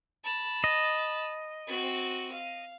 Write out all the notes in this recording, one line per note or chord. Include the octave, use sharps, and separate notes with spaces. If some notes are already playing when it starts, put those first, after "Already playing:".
A5 B5
D#5
C4 F#4
F5